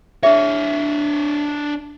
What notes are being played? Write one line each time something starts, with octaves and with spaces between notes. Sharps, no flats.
D4 G#4 C#5 E5